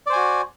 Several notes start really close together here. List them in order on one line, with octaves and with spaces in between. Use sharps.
D5 C5 G#5 F#4